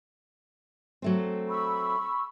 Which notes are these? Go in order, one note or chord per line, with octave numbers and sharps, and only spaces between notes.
F#3 A3 C4
B5 C#6 E6